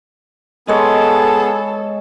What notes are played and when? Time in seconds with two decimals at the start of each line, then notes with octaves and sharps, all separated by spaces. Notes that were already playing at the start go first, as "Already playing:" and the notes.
0.68 G#3 B3 G#4 A4 C#5